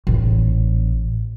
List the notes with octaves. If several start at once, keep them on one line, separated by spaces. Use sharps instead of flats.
A1 A#2